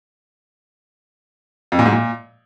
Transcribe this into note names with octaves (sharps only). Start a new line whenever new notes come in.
F2
A#2
G#2
A#2